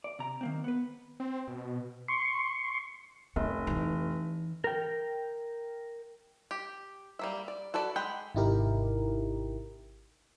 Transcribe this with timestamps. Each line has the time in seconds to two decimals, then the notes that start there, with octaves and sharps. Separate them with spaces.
0.04 D5
0.19 C3 A#5
0.41 D#3 A#3 C4
0.64 B3 B4
1.20 C4
1.48 B2
2.08 C6 C#6
3.36 F1 D4
3.67 E3 D#4
4.64 A#4 G5
6.51 G4
7.19 G3 A#3 E5
7.48 D5
7.74 F#4 A4 B4 D5
7.96 G#3 F#5 G5 B5
8.35 G#1 C3 D#4 E4 G4 A#4